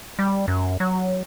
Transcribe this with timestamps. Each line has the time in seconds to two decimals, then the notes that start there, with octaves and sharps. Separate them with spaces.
0.19 G3
0.48 F#2
0.80 F#3